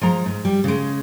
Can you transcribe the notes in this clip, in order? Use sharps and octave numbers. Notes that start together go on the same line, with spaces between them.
F3 G#3 A#5
G#2
G3
C#3 G#3